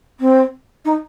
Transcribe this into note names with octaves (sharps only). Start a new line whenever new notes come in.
C4
D#4